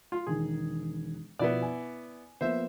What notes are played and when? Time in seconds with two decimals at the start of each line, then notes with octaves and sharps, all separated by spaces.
0.12 F4
0.27 E1 D#3 G#4
1.39 B2 F3 B3 E4 D5
1.62 G#5
2.41 F3 A#3 B3 C5 E5